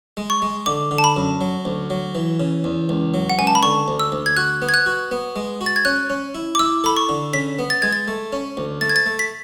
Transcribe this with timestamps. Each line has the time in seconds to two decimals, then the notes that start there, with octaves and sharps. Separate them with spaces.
0.17 G#3
0.30 C#6
0.42 G#3
0.66 D3 D6
0.91 D3
0.98 A5
1.04 B5
1.16 F#2
1.41 F#3
1.65 D2
1.90 F#3
2.15 E3
2.40 C#3
2.64 E2
2.89 C#2
3.14 F#3
3.30 F#5
3.39 C#2 G#5
3.47 A5
3.55 B5
3.63 D3 C#6
3.88 D2
3.99 E6
4.12 D2
4.26 G#6
4.37 F#4 F#6
4.62 B3
4.69 G#6
4.74 F#6
4.86 F#4
5.11 B3
5.36 G#3
5.61 F#4
5.66 A6
5.76 G#6
5.85 C#4 F#6
6.10 C#4
6.35 E4
6.55 D6
6.59 E4 E6
6.84 A4 B5
6.97 C#6
7.09 D3
7.33 C#3 B6
7.59 B3
7.70 A6
7.82 G#3 G#6
7.93 A6
8.08 A3
8.33 C#4
8.57 D2
8.81 A3 A6
8.89 G#6
8.96 A6
9.06 A3
9.19 B6